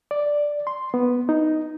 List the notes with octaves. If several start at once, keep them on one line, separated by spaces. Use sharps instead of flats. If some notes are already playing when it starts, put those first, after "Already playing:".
D5
C6
B3
D#4